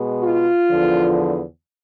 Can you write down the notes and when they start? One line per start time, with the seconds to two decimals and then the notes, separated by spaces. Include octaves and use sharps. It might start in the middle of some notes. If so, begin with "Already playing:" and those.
Already playing: B2 G#3
0.23 F4
0.69 E2 D3 F3